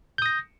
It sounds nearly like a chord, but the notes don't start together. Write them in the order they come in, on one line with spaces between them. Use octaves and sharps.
G6 D#6 A#6